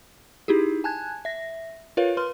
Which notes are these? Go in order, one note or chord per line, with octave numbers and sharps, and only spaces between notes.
D#4 E4 G4 G#4
G#5 A5 F#6 G#6
E5 A#6
F4 A#4 B4 C#5 F5
B4 C6 F6